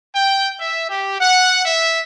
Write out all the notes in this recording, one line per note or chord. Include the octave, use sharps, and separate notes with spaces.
G5
E5
G4
F#5
E5